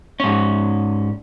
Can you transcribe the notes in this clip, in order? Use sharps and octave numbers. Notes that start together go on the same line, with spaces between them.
G#2 C#4